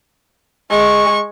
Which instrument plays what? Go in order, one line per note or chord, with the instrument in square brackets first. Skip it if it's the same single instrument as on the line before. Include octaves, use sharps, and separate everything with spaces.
[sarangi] G#3 [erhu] C#6